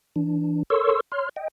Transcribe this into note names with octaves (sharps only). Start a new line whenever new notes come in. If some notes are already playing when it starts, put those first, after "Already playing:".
E3 D4
A4 A#4 C#5 C6 C#6 E6
C#5 C6 F6
D#5 G5